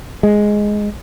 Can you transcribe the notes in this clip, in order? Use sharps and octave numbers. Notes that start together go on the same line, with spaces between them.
G#3